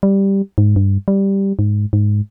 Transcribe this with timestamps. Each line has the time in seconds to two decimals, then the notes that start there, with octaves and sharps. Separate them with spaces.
0.03 G3
0.58 G#2
0.76 G2
1.08 G3
1.59 G#2
1.93 G#2